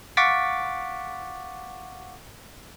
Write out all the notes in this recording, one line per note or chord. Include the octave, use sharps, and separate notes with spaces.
F5 F#5 C#6 D6 A6 B6